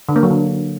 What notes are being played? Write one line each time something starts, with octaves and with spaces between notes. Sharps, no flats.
D3
A#3
F#3
D3